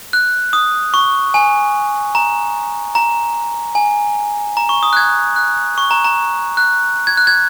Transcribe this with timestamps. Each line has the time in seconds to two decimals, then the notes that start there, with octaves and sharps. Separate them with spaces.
0.13 F#6
0.53 D#6
0.94 C#6
1.34 G#5
2.15 A#5
2.95 A#5
3.75 G#5
4.57 A#5
4.69 C#6
4.83 D#6
4.93 F#6
4.97 G#6
5.36 F#6
5.78 C#6
5.91 A#5
6.05 A#5
6.57 F#6
7.07 G#6
7.17 F#6
7.27 G#6